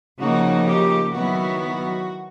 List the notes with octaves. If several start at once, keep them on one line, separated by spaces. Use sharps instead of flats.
C#3 F3 A#3 D#4 F#4
G4
D#3 F#3 B3 E4 F#4